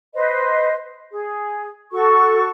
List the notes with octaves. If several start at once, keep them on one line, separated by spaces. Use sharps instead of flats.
B4 C5 D#5
G#4
F#4 A4 C#6